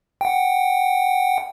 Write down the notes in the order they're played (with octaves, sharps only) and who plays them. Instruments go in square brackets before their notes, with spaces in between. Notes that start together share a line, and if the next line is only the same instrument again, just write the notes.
[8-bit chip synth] F#5 G5